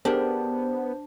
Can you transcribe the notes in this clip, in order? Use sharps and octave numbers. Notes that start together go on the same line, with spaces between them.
B3 D4 G4 G#4 A#4 C5